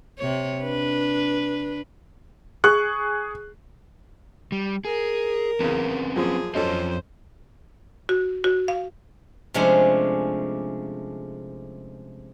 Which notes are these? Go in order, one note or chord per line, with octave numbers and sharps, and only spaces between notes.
C3 C#5
D4 B4
G#4 C#6 F#6
G3
G#4 A#4
E2 C#3 C4 C#4 B4
F#2 A#2 F3 G#4
F2 F#3 C#4 F4 A4 C5 D#5
F#4
F#4
F5
C3 F3 G#3 A3 C#4 D4